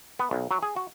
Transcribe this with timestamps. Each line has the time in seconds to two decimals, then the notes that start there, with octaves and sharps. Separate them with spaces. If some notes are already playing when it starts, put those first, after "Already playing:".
0.19 B3
0.31 B1
0.51 F#3
0.63 G#4
0.76 F#4